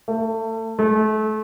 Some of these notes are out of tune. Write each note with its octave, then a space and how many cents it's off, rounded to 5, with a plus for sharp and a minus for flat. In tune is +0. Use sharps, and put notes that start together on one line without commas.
A3 +30
A3 -30